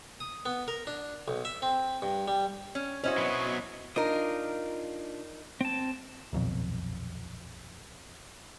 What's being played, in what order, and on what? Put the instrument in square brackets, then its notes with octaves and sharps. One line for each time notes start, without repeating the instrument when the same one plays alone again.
[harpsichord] D#6
B3
A#4
D4
B1
E5
C4
G2
G3
[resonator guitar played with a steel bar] C#4
[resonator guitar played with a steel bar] C#4 E4 F#4 [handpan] C5 D#5
[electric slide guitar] B2 F#3 B3
[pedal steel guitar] D4 F4 D#6 [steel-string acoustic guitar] D#4 A#4
[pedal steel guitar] C4 A5
[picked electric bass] D#1 B1 F2